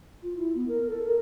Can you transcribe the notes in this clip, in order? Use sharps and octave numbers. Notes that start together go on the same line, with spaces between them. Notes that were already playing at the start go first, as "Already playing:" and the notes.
F4
E4
B3
A#4
A4
A#4